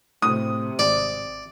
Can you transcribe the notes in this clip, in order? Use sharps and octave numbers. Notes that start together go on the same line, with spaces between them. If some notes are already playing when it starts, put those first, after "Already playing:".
A2 C3 D#6
G#1 D5